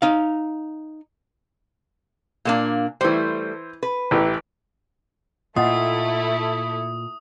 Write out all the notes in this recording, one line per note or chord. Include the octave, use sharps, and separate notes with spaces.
D#4 F5
A#2 A#3 D4
E3 G3 A3 C5
B4
A1 E3 G4
A#2 A3 E4 F4 A4 D#5 F#5 D#6